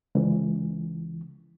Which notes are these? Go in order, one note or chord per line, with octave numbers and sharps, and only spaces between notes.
C#2 E3